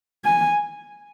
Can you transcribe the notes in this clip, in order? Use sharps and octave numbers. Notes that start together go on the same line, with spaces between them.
G#5